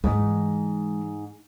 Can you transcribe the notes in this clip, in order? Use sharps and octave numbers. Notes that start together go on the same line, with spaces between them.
G#2 E3 G#3